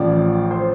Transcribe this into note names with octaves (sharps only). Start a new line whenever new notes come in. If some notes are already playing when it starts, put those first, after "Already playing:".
Already playing: A1 A2 F3 D5
C5